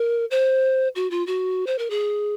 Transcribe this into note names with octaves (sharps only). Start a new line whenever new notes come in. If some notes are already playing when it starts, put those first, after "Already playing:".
Already playing: A#4
C5
F#4
F4
F#4
C5
A#4
G#4